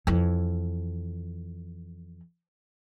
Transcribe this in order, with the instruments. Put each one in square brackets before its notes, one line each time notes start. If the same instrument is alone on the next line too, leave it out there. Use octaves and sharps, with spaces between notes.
[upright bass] F2 E3